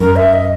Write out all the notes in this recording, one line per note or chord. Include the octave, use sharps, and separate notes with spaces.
F#2 A#4
E5
D#5